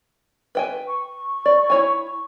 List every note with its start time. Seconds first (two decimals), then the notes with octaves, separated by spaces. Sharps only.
0.55 B4 G5 G#5
0.87 C#6
1.46 D5
1.70 E4 C#5 G#5
2.07 C#6